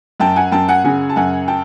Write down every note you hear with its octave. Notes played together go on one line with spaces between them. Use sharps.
F#2 G5 A5
F#5 G#5
F#2 G5 A5
F#5 G#5
C#3 F#5 G#5
A5
F#2 F#5 G#5
G5 A5